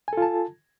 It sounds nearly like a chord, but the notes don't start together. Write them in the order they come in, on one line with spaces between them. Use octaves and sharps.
G#5 A4 F4 A5